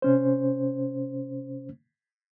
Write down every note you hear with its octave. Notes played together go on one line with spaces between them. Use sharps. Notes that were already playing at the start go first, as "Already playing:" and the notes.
C3 C#4 C5